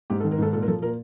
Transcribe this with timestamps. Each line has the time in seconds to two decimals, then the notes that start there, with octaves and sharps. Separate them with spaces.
0.10 G#2 G4
0.20 A4
0.24 D#3
0.31 A#4
0.38 G#2 A4
0.53 A#2 A4
0.62 A#4
0.68 F3 A4
0.82 A#2 A#4